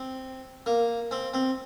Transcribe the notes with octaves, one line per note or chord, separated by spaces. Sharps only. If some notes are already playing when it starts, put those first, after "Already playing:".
Already playing: C4
A#3
C4
C4